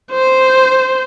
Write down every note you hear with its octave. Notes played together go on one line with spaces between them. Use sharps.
C5